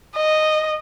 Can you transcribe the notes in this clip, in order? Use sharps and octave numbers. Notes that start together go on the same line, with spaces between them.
D#5